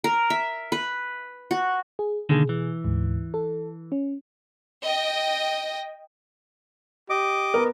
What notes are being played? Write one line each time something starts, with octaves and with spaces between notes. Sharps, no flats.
A#4
E5
B4
F#4
G#4
B2 D3 D#3 A#3 G#4
E3
D2 G#2
A4
C#4
D#5 G5 A#6
G4 D#5 D6
B3 A#4